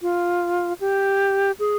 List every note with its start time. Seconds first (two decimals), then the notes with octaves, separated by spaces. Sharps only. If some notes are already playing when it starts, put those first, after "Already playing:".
0.02 F4
0.80 G4
1.60 G#4